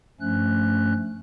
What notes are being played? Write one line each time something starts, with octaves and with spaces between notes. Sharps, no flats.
G2 F3 A3 C#4 F#6